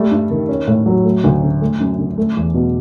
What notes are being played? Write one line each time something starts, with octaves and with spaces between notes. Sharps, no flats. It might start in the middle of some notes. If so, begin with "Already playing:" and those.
Already playing: G3 A3
G2
D#3
C#4
A2
F#3
A3
D2
D3
A3
F#2
D3
A3
E2
B2